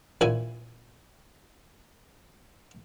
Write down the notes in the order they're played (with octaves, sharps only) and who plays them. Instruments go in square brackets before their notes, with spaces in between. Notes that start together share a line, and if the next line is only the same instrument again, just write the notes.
[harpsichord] A#1 A#2 E4 G#5